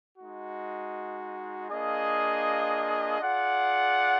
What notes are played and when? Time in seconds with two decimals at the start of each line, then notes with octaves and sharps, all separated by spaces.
0.17 G#3 D#4 F#4
1.68 A#3 D4 F4 G#4 D#5
3.19 F4 G#4 D5 F#5